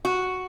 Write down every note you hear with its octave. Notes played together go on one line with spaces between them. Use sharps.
F#4